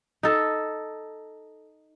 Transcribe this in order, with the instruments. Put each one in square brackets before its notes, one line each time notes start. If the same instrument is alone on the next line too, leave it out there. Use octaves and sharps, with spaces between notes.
[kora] D#4 A4